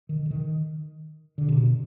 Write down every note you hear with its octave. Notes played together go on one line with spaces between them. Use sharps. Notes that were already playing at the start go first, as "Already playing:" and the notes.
D#3
D3
D#3
D3
C3
B2